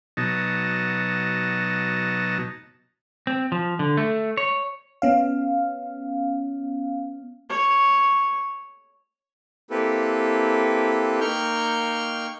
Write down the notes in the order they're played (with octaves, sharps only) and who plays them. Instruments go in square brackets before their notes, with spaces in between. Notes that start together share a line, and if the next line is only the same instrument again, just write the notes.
[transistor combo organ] B2 F#3 D#4 A5
[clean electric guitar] C4
F3
D3
A3
C#5
[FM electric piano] B3 C#4 F5
[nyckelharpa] C#5
[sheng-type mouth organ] A#3 C4 E4 G4 A4 B4
A#3 D#4 G5 C#6 F6 G6